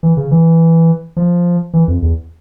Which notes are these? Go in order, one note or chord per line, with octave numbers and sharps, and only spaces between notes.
E3
C#3
E3
F3
E3
F2
E2